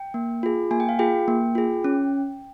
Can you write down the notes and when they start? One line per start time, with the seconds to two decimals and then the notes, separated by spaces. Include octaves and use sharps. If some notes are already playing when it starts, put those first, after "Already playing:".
Already playing: G5
0.14 A#3
0.43 F4 G#4
0.71 A#3 G#5
0.80 G5
0.89 F5
0.99 F4 G#4 G5
1.28 A#3
1.55 F4 G#4
1.84 C#4